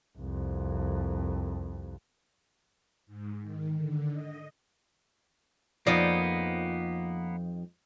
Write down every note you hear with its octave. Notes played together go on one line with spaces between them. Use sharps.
C2 F2
G#2
D#3
D3
D#5
F2 F3 A#3 B3 D#4 D5